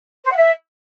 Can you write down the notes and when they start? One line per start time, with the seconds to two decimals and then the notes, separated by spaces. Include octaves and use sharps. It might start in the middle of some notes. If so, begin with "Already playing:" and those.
0.24 C5
0.30 F#5
0.37 E5